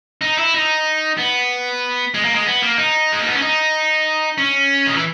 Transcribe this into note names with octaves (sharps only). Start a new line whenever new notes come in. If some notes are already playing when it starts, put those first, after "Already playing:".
D#4
E4
D#4
B3
G#3
A#3
G#3
B3
A#3
D#4
G#3
A#3
B3
C#4
D#4
C#4
D#3
E3